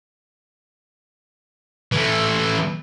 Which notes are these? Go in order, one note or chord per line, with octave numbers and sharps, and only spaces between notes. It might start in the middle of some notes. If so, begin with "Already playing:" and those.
E3 A3